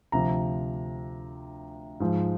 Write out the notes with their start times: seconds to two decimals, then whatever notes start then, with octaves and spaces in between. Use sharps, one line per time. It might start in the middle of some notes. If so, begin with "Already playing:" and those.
0.12 D2 C3 F3 A#5
2.00 G#2 F3